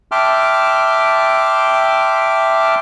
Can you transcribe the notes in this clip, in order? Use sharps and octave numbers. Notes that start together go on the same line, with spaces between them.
E5 G5 A5 C6 D6 F6